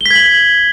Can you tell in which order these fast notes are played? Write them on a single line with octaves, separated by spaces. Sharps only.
G7 B6 G#6 F#7